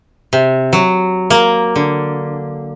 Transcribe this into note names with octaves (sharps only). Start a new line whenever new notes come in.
C3
F#3
A#3
D3